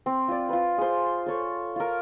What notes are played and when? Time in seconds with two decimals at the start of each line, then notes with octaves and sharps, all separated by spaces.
0.06 C4
0.28 F4 D5
0.49 F4 B4
0.78 G#4 C5
1.26 A4 C#5
1.76 F4 A#4